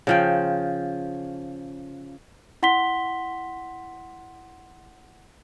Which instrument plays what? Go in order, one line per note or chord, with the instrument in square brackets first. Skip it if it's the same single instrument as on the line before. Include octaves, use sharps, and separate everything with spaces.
[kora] C#3 F3 G5
[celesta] E4 F#5 C6 B6 G7